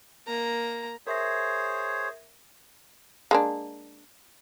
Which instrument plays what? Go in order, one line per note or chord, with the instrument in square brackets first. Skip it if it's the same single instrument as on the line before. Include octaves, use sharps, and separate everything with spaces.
[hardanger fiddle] A#3 A#5
[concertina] G#4 C5 C#5 [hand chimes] A#4 E5 A#6
[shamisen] G#3 A#3 D4